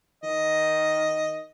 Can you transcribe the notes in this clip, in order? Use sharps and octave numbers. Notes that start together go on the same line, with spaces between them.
D#3 D#5